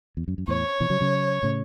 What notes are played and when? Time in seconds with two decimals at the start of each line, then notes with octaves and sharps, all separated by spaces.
0.17 E2
0.28 F#2
0.38 F#2
0.48 E2 A2 C#5
0.80 B2 E3
0.90 C#3 F#3
1.00 C#3 F#3
1.43 A2 C#3